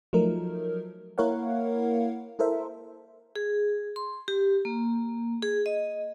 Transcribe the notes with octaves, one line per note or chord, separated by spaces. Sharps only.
F3 F#3 A3 D#4 A#4
A#3 E4 A#4 C#5 F5 F#5
E4 A4 A#4 C5 E5
G#4
C6
G4
A#3
G#4
D#5